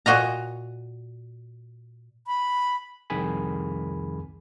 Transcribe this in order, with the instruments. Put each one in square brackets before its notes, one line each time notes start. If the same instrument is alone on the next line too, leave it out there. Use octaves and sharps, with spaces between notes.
[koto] A#2 F#4 D#5 A#5
[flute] B5
[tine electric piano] C2 F2 D#3 G#4 G#5 B5